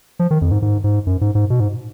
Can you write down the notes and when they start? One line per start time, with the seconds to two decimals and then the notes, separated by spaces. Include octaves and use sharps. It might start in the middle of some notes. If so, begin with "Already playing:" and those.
0.19 F3
0.31 D#3
0.41 F2
0.51 G#2
0.62 G#2
0.84 G#2
1.07 F#2
1.21 G#2
1.35 G#2
1.50 B2
1.60 G#2